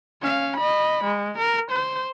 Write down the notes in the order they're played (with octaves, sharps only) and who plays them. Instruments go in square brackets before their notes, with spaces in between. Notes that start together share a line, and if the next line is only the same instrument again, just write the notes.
[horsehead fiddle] C#4 F5
D#5 B5
G#3
A#4
C5